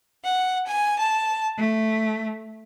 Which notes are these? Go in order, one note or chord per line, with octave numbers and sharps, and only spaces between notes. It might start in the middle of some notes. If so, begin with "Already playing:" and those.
F#5
G#5
A5
A3